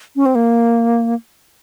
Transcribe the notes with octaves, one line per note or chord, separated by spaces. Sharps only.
C#4
C4
A#3